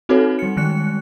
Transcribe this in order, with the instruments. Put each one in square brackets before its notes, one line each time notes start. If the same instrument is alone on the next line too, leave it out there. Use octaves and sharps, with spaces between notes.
[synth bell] C4 D#4 F#4 A4 B4 C#5
G3 C#7
D#3 G#3 F#6 C#7